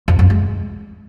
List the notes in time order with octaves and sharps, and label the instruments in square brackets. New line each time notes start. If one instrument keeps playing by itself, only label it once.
[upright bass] F2
F#2
G#3